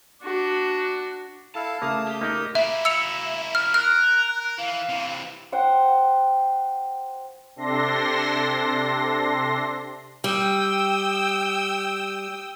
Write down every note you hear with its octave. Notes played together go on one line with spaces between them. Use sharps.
D4 F#4
E4 A4 F5 A5
C#3 A3 A#3 F5 D#6
G4
A#3 D#4 A#4
A#3 E4 E5
E5 E6 C#7 F7
F6
A#4 F6 F#6
E3 F5
C3 E3
C5 F#5 G5
C3 D4 A4 C6 A#6
G3 G5 D#6 E6